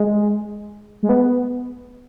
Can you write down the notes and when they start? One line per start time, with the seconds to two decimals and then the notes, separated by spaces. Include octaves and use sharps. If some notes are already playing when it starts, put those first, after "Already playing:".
Already playing: G#3
1.03 G#3
1.09 B3